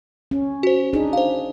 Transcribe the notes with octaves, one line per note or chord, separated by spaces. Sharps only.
C#4
F#4 C5
D4 D#4 G#4
C5 F5